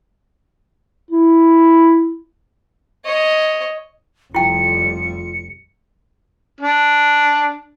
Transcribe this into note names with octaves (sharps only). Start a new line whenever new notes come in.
E4
C#5 D#5
F1 F2 G3 E4 F4 G5 C#7
D4